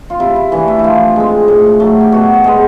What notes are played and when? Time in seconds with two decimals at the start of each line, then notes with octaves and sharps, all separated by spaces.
0.10 F4
0.20 C3 E4
0.36 E4
0.52 E3 A3 D4 E4
0.68 E4
0.79 E4
0.84 F3 F4
1.16 G#3 C4
1.48 A2
1.80 F#3 A3
2.01 G4
2.12 B2 F#4
2.34 G4
2.44 G#3 B3